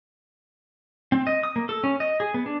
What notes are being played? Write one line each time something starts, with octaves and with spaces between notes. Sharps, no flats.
C4
D#5
D#6
A#3
A4
C#4
D#5
G#4
B3
D4